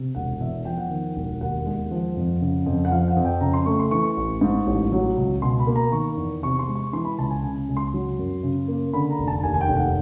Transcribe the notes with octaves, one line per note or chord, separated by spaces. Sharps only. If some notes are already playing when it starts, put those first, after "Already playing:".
Already playing: C3
E1 F#5
E2 E5
F3 G5
F#5
D#3
E1
D#2 F#5
G#3
F3
F2
C#3
F2
F#5
F3 F5
F#5
F2
G5
C#3 A#5
C6
A3 C#6
C6
E3 C#6
A1
G#2
A1
F#3
C#2
B2 C6
B5
A#3
A#5
D#3 C#6
E2
C3 C#6
C6
G#3
C#6
E3 C6
B5
C#2 A5
G#5
C#3 G#5
C#2
C6
F#3
F#2
C#3
A#3
D3 B5
A#5
F1
A5
D#2 G#5
G#5
G5
F1
F#5